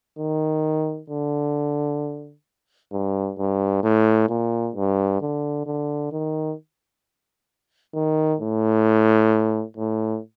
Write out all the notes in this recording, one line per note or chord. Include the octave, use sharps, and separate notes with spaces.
D#3
D3
G2
G2
A2
A#2
G2
D3
D3
D#3
D#3
A2
A2